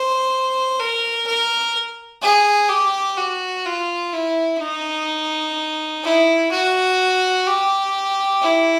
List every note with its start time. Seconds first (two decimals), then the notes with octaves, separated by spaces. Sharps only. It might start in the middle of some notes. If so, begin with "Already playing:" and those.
Already playing: C5
0.80 A#4
1.27 A#4
2.22 G#4
2.69 G4
3.17 F#4
3.66 F4
4.13 E4
4.61 D#4
6.03 E4
6.51 F#4
7.47 G4
8.41 E4